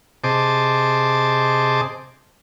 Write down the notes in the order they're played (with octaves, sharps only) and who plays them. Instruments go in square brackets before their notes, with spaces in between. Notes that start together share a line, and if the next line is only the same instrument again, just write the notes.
[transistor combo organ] C3 G#4 C5 D#5 A5 D6